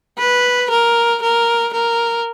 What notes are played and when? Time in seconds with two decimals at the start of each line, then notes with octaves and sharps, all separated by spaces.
0.18 B4
0.70 A#4
1.22 A#4
1.73 A#4